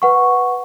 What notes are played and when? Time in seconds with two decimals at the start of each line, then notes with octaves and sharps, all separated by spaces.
0.02 B4 F#5 C#6